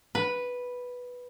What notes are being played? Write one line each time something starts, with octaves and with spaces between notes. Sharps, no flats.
B4